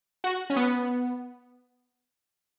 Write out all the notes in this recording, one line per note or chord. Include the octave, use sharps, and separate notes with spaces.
F#4
C#4
B3